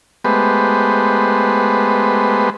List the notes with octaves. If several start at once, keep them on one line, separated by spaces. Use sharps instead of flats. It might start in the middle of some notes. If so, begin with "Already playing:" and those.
G#3 A3 B3 G4 B4 C5